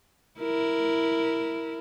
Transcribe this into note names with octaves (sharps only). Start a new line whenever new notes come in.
E4 A#4